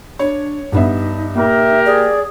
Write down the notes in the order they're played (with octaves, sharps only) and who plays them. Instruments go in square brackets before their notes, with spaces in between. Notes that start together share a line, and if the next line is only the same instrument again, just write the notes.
[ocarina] D4 [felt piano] C#5
[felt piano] G2 B3 E5 [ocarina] D#4
[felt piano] A#2 [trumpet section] G4 A#4 [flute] E5
[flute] G#4 [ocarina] D5